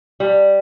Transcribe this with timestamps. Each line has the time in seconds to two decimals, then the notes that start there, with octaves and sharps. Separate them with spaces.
0.20 G3